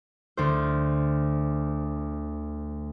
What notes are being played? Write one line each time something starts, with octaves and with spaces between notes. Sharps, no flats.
D2 C5